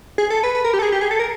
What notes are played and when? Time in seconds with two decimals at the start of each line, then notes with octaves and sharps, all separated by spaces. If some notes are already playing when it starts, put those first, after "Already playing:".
0.18 G#4
0.30 A4
0.43 B4
0.55 B4
0.64 A#4
0.73 G4
0.79 A4
0.82 G#4
0.92 G4
1.01 G#4
1.11 A4
1.19 A#4